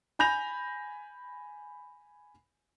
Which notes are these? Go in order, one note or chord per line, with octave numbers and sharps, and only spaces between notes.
G#5 B5 G6 A#6 F7